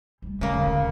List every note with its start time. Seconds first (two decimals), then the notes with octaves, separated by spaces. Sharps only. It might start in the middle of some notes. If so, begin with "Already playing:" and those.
0.22 G3 A3
0.41 C#3 G#3 A#3
0.54 D#1 D3